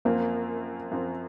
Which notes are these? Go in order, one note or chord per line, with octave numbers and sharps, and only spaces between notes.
F#2 F3 A#3 C4
F#2 F3 C4